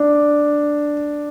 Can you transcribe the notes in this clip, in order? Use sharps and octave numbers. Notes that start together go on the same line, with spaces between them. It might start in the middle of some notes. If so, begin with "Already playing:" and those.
Already playing: D4